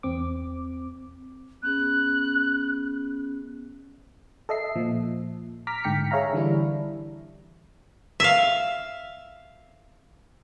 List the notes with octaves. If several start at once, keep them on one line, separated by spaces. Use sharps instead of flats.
E2 C4 D6
B3 C#4 G#4 F#6
A4 D#5 E5 C7
A#2 F3
A#5 D6 F6 B6
G#2 D3 G5 B6 C#7
G#4 C#5 E5 F5 A#5
D3 E3 G3 D4 E4
E5 F5